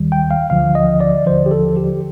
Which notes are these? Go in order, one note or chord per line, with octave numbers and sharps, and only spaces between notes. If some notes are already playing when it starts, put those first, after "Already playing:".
Already playing: D#2 D#3 G3
G5
F5
D2 D3 F3 F5
D#5
D5
D#2 D3 F3 C5
G4
A4
G4